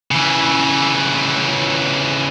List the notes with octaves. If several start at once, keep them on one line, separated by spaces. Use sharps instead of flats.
C#3 E3